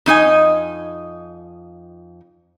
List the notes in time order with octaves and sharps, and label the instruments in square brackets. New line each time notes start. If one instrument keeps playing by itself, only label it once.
[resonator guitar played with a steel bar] F2 D#4 D#5 G#5